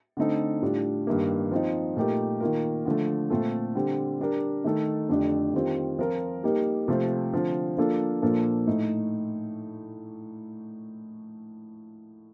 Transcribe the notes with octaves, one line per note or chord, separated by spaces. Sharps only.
D3 A3 C4 D#4 A4
A2 G3 D4 F4
G2 D#3 A#3
F3 C4 D#4
A#2 A3 D#4 G4 A#4
D#3 A#3 F4 A#4
D3 F3 A3
A#2 A3 C4 F4 A4
D3 G3 C4
G3 D4 G4 A#4
D#3 A3 D#4 A4
F2 D3 A3 D4 G4
D#3 G3 C4 F4
F3 C4 F4 A#4
G3 A#3 D#4 G4 A#4
C3 F3 A3 C4
D3 F3 C4
F3 A#3 D4 F4 A4
A#2 F3 A#3 D4 A4
A2 A3 D#4